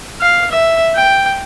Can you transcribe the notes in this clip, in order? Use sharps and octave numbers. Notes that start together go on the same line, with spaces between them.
F5
E5
G5